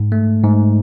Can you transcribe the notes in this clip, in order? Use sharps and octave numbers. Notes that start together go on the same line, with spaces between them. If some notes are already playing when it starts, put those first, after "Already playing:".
Already playing: G#2
A3
G#2